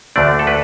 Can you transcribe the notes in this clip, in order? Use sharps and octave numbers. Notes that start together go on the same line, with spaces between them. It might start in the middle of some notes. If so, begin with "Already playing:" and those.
D2 D3 A3 D4 D5
A4
B4